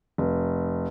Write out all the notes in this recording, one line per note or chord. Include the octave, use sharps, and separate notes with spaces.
F1